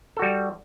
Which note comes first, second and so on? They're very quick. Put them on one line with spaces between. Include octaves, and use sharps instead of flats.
A4 F#4 G3